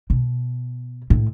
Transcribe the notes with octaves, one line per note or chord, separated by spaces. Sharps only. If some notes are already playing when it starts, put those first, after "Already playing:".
B2
A2